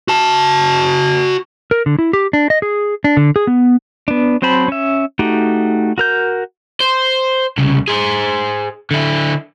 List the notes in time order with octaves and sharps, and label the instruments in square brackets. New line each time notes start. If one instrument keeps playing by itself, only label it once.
[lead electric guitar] F#4 A5
[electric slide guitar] A#4
D3
E4
G4
D4
D#5
G#4
D4
D3
G#4
B3
[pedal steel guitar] B3 D4
F#3 C4 C5 A5 B5
C#4 E5
A3 D#4 F#4 G4
F#4 A#4 G6
[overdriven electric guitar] C5
C2 C#3
G#4 C5
D3 E4